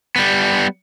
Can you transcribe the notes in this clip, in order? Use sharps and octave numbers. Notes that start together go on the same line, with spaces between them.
G3 B3